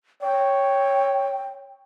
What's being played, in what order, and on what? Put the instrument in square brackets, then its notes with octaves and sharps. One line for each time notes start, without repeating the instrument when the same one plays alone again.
[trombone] C#5 [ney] G5